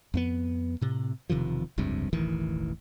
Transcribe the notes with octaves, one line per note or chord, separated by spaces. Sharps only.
F2 A#3 B3
A2 C3
E1 C3 D#3 F3
F1 C#2 G2 C3
E1 A1 D#3 E3